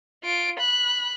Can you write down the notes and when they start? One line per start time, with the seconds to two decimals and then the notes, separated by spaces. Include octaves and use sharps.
0.24 F4 D7
0.59 B5 F#6